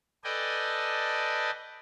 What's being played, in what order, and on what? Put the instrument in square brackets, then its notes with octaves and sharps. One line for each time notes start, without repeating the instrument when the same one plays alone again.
[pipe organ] A4 B4 D5 D#5 G5 G#5